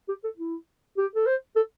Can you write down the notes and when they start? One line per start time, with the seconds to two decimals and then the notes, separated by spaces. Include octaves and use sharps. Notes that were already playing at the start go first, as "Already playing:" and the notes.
0.09 G4
0.24 A4
0.37 E4
0.97 G4
1.15 A4
1.26 C5
1.56 A4